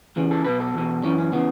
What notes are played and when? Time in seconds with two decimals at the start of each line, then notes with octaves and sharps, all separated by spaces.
0.16 E2 C#3 E3
0.31 A4
0.45 B1 B2 B4
0.60 A4
0.74 E2 B2
1.03 F#2 E3 C#4
1.18 C#4
1.32 C#3 E3 B3